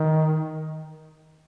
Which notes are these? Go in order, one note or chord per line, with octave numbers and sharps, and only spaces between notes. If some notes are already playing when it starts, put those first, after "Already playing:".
Already playing: D#3